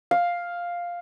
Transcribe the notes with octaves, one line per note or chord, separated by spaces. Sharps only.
F5